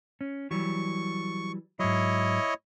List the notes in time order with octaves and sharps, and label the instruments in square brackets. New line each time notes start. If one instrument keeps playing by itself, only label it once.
[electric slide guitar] C#4
[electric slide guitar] E3 F#3 G3 [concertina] C#6
[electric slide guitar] G#2 F#3 [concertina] E4 C#5 D#5